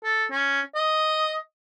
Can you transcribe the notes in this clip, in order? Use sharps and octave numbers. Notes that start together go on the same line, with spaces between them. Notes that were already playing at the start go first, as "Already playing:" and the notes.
A4
C#4
D#5